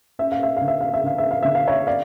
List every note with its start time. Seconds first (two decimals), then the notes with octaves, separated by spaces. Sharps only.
0.19 C#4 E5
0.32 F5
0.43 E5
0.57 D3 F5
0.68 E5
0.81 F5
0.94 E5
1.04 D3 F5
1.18 E5
1.31 F5
1.43 D3 E5
1.55 F5
1.67 C#5 E5
1.87 D5 F5